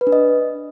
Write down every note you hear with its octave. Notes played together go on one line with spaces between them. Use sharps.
B4
D4
D#5